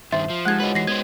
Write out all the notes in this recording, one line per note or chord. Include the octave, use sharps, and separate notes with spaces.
G2 D#3 C5 E5 C6
F3 C7
G#3 D#4 G4 A4 F#5 F#6 G#6
F4 F#4 B4 C#5 D#5
E3 A#6 C7
B3 C5 G#6